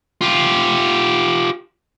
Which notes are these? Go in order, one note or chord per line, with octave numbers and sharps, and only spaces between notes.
F4 G4